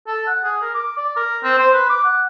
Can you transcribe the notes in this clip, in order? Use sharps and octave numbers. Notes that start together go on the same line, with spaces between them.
A4
F#5
G#4
A#4
D6
D5
A#4
C4
C5
B4
D6
F#5